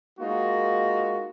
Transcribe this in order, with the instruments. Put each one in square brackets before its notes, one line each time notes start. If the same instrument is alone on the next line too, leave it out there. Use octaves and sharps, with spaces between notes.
[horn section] G#3 A#3 D#4 F4 F#4